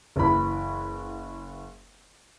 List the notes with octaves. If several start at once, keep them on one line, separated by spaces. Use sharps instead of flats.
F#1 E3 B5